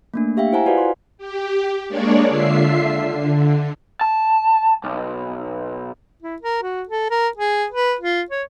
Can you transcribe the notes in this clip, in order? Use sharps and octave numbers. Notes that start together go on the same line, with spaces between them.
A3 A#3 D4
G4 E5 F5 G5
E4 C5 F#5 G#5 A#5
F4 F#4 B4 D5 D#5 F5
C6
G4
G#3 A#3 D4 C#5 D5
D3 F4 E5 C7
D3
A5
B1
E4
A#4
F#4
A4
A#4
G#4
B4
F4
C#5